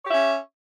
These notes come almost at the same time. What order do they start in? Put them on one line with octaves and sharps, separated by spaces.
C#5 G4 E5 C#4